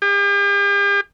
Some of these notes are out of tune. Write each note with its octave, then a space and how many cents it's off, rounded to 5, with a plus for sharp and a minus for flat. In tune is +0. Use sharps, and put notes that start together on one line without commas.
G4 +45